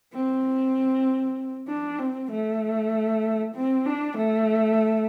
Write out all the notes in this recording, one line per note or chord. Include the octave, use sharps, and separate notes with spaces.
C4
D4
C4
A3
C4
D4
A3